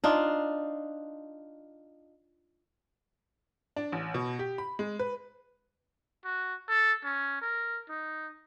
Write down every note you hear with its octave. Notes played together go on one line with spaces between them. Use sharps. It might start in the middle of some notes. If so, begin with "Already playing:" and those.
D4 D#4 F4
D4
A1
B2
G4
B5
G#3
B4
F#4
A4
C#4
A#4
D#4